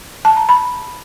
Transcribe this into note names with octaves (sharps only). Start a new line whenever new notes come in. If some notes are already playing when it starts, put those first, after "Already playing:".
A5
A#5
B5